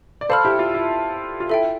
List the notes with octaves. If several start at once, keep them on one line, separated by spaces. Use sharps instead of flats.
D5
A4 C5 F5 B5 F6
E4 G4
F4
E4
F4
E4 A4 E5 G5